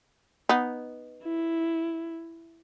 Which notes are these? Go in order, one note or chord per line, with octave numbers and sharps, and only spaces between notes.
B3 D#4
E4